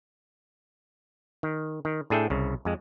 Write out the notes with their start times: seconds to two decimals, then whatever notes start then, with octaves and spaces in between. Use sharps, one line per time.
1.43 D#3
1.85 D#3
2.10 A2 D4 G#4 A4 E5 G5
2.30 C2 C#3
2.65 F2 G#3